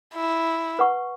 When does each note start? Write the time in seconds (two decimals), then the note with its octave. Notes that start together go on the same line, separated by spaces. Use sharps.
0.14 E4
0.79 B4 F#5 C#6